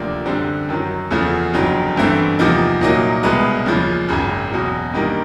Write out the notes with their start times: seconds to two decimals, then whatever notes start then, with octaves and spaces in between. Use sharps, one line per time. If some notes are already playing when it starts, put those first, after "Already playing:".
Already playing: D2 C3 F3 A#3 D4
0.26 F#2 D3 G3 C4
0.69 F#2 D#3 F#3
1.11 E2 C#3 F3 A3
1.54 G1 F2 C#3 F#3
1.96 G1 G2 E3 A3 C4
2.39 E2 C3 F3 A#3 D#4
2.81 C2 A#2 F#3 A#3 D#4
3.23 C2 B2 G#3 B3
3.66 D#2 C#3 F3
4.09 G#1 F#2 C#3
4.51 E2 B2 F#3
4.94 G2 D#3 G3 A#3 D#4